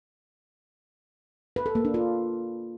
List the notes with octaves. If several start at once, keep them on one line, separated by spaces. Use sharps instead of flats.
B4
A4
A#3
D4
F4